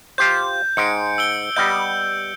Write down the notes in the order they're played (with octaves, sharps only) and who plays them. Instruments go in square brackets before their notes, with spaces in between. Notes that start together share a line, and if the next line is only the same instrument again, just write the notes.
[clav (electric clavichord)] F4 G4 C5 [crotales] G6
[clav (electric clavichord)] G#2 G#3 G5 [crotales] C#7 D7
[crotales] E6 D7 G7
[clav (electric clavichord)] G3 B3 D#5 [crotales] G6